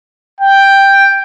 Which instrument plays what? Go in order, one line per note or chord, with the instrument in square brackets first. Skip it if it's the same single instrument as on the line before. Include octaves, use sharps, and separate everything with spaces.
[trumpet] G5